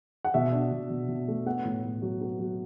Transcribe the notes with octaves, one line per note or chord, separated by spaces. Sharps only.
F#5
B2 E5
D4
B2
B2
B2
A3
B3 F#5
A2
A2
F#3
B3
F#3